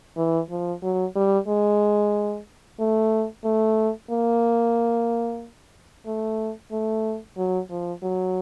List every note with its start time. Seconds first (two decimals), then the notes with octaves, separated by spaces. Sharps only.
0.17 E3
0.50 F3
0.83 F#3
1.16 G3
1.48 G#3
2.79 A3
3.45 A3
4.10 A#3
6.06 A3
6.72 A3
7.37 F#3
7.70 F3
8.03 F#3